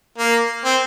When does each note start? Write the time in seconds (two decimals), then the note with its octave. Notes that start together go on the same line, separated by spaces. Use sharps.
0.18 A#3
0.65 C4